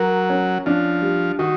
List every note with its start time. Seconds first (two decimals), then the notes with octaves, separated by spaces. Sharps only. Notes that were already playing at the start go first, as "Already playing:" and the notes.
Already playing: F#3 A#4
0.30 C#4
0.66 F3 D4
1.02 G3
1.39 D#3 F#4